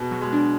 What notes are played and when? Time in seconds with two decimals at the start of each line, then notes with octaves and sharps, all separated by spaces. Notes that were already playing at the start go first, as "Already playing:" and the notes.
Already playing: B2 G#4
0.11 F#3
0.21 G#3
0.32 D4